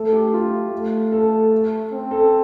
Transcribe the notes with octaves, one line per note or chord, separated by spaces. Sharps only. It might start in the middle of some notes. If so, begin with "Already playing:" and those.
Already playing: A3 A4
G4
F4
A3
A4
C4
A4